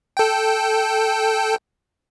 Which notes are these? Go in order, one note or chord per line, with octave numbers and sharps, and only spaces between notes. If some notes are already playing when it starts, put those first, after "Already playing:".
A4 G5